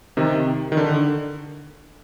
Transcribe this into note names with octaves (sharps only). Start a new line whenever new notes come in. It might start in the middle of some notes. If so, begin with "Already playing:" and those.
C3 D#3
D#3
D3